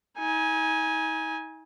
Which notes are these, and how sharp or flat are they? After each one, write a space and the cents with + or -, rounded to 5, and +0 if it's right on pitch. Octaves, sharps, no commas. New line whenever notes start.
D#4 +40 G#5 +0